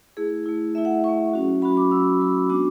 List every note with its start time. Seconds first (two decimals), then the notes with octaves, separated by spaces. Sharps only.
0.17 A3 E4 G#4
0.46 A3 E4
0.75 A3 E4 E5
0.85 F#5
0.94 E5
1.04 A3 E4 C#6
1.33 F#3 C#4 F#4
1.62 F#3 C#4 F#4 B5
1.77 D6
1.91 F#3 C#4 F#4 E6
2.20 F#3 C#4 F#4
2.49 G#3 B3 D4 F#4 D6